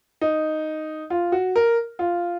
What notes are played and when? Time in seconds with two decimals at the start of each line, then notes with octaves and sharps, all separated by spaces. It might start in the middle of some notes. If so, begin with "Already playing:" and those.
0.21 D#4
1.10 F4
1.32 F#4
1.56 A#4
1.99 F4